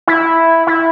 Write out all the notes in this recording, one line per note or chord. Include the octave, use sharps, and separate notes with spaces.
E4
E4